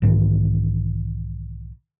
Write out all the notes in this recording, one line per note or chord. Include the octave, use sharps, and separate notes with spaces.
B1 G#2 D#3 E3